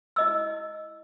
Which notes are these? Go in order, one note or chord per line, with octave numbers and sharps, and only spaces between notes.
E4 D#5 E6